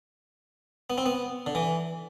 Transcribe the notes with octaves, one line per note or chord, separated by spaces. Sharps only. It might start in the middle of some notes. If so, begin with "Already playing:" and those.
B3
C4
B3
D3
E3